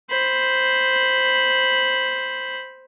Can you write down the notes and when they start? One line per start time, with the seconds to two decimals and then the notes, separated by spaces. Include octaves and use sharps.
0.10 C5 B5